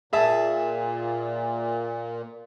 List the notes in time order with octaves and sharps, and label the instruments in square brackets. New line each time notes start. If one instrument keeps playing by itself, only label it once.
[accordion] A#2 [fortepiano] G#4 E5 A5